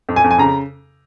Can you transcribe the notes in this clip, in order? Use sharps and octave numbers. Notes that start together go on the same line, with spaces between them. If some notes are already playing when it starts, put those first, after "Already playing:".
F2
G#5
F2
G#5
C#3 A#5